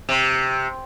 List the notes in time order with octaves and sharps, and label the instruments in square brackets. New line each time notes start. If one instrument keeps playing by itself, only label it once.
[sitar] C3